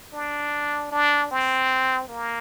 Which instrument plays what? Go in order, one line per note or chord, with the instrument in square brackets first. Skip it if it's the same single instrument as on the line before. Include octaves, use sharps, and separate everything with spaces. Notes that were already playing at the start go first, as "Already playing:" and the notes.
[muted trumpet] D4
D4
C4
A#3